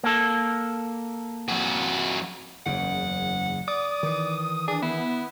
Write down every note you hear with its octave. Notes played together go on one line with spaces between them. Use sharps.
A#3 A4
F2 F#4
F#1 E2 C#3 F#5
D5 D#6
D#3 E3
D4 G#4
B3 E4